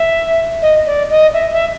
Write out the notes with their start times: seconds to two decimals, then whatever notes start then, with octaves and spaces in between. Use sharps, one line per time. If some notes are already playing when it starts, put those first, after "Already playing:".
Already playing: E5
0.62 D#5
0.86 D5
1.10 D#5
1.33 E5
1.52 E5